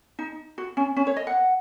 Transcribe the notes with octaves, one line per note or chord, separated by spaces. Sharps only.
D#4
F#4
C#4
C#4
C#5
D#5
F#5